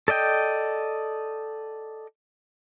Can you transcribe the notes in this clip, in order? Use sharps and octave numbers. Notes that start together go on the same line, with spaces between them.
A4 D5 D#5 G5